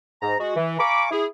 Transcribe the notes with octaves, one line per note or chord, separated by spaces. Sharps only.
G#2 A#5
G#3 F#4
E3
F5 G#5 A#5 B5 C#6 D6
E4 G#4